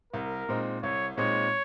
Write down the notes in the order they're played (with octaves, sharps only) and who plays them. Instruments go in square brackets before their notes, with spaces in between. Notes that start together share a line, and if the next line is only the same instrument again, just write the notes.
[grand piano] C2 [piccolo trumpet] A#4
[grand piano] A#2 G#3 C4 D#4
[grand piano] C2 [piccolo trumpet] C#5
[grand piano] A#2 G#3 C4 D#4 [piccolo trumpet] C#5